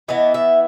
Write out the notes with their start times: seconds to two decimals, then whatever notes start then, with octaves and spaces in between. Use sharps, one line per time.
0.08 E3 B3 E4 D#5
0.34 E5